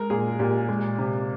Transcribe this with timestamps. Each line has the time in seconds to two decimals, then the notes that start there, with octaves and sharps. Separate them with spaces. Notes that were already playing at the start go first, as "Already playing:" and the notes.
Already playing: G#3 A#4
0.10 A#2 G#4
0.39 A#2 G4
0.69 G#3
0.98 C3